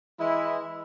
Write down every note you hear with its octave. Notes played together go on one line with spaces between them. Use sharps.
E3 G#3 E4